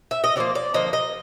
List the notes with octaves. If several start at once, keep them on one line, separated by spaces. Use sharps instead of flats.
E5
D#5
D3 F3 A#3 D5
D5
D3 F3 A#3 D#5
D#5